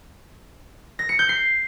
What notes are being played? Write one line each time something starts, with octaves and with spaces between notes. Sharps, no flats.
A#6
C#7
G6
C7